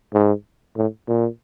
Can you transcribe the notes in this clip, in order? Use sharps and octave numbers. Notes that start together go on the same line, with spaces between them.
G#2
A2
A#2